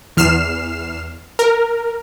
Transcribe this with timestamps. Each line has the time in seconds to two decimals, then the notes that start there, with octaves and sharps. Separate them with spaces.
0.17 E2 F6 C7 E7
1.39 A#4